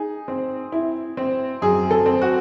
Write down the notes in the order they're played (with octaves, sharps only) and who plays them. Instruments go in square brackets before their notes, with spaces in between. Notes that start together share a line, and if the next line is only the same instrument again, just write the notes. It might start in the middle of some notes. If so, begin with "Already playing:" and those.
Already playing: [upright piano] D#4 G#4
C4
E4
C4
F#2 G#4
A4
C4
F#4